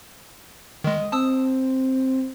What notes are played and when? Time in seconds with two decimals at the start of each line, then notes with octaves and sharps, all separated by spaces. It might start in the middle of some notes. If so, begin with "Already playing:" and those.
0.84 D#3 G#3 D#5
1.12 C4 A5 D#6 E6